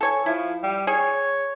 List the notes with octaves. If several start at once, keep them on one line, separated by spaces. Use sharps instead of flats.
A4 C#5 G#5
F3 E4
G3
G#4 C#5